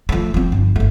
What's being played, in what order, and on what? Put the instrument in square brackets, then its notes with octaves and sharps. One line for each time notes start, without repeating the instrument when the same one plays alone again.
[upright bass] F3 A3
F3 C4
G1
G1 A3